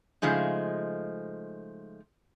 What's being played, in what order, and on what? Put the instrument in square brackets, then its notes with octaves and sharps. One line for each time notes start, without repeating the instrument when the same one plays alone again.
[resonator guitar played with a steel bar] C#3 F3 G#3 A3 D#4